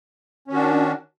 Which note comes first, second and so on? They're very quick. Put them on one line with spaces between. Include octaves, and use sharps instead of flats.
C#4 D#3 F#4 D4